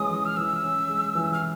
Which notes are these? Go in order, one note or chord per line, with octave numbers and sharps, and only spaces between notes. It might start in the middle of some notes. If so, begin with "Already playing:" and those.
Already playing: E3 G#3 C#4 D#6
E3
F6
E3 E6
C#4
G#3
E3
F6